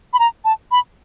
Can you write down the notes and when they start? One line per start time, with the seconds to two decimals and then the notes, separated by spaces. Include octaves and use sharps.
0.13 B5
0.19 A#5
0.45 A5
0.71 B5